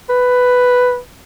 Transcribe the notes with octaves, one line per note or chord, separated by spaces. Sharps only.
B4